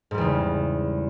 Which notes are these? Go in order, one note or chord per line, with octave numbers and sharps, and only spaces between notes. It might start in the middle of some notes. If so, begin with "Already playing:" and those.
E2 G#2 C#3 G3